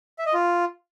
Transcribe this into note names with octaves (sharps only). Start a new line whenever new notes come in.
E5
D#5
F4